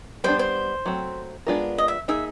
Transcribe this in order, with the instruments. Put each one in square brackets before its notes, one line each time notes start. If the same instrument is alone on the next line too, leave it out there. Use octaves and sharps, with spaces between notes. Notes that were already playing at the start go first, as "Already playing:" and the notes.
[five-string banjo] G3 B3 D4 [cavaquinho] C5
[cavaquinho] C5
[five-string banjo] F#3 A3 C4
G#3 B3 D4 F4 A#4
[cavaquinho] D#5
E5
[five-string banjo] A#3 D#4 G#4 [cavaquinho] E5